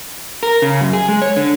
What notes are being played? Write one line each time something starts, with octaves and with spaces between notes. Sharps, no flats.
A#4
C#3
F#2
G#4
G#3
C#5
D3